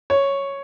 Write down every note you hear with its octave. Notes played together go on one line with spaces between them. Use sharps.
C#5